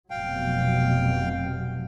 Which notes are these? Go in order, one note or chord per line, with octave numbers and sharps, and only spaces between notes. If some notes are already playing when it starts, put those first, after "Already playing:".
F1 B2 F#3 F5 G5